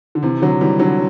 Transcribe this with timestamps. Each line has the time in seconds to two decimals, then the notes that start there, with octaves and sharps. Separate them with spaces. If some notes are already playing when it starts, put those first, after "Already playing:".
0.15 D3
0.23 C3 E3
0.42 D3 F#3
0.61 E3 G3
0.79 D3 F#3